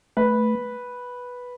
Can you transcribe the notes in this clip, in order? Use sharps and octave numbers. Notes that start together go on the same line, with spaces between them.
A3 B4